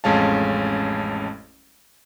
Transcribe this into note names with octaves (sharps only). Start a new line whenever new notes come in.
A1 F2 G#3 C#4 F5 A5